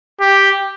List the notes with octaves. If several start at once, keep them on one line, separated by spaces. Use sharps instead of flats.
G4